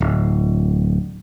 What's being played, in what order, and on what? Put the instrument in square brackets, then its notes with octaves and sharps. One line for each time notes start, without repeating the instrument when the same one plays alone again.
[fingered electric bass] D1